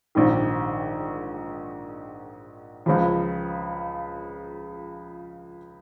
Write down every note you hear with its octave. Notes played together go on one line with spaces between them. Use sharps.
A#1 G#2 D#3
C#2 C#3 F3